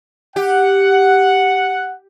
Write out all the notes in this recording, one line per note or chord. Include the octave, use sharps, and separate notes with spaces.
G4 F#5